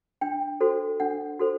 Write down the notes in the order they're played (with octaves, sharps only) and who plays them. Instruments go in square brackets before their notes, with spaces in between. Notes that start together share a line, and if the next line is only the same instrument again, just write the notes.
[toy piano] D4 G5
F#4 A4 C5
D4 F#5
F#4 A4 C5